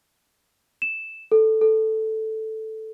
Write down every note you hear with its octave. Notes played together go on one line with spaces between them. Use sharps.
E7
A4
A4